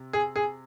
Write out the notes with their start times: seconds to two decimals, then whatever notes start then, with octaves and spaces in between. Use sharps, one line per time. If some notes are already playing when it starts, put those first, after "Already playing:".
Already playing: C3
0.13 G#4
0.36 G#4